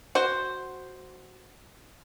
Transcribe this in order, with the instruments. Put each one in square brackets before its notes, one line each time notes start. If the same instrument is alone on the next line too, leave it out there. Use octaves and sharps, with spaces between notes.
[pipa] F#4 C5